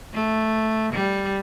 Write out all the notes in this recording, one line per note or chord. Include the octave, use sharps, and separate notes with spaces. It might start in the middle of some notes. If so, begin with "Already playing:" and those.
A3
G3